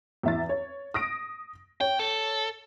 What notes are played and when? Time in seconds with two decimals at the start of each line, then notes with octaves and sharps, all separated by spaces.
0.23 E2 E5 A6
0.49 C#5
0.94 D#6 A#6 D7
1.81 C#5 G5
1.99 A4